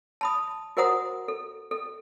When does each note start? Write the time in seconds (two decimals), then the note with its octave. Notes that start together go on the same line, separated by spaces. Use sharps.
0.21 A5 B5 D#6
0.77 F#4 A#4 C5 F#5 A#5 D#6
1.28 A4
1.71 A4